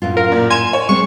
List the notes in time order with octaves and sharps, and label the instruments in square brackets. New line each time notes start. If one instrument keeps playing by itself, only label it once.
[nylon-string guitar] F#2 A2 F4
[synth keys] A#4 [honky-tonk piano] F5
[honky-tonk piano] A#2
[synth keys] G#5 G#6 [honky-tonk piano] C6 E7
[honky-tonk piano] C#5
[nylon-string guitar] G#3 C4 C5 [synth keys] C#6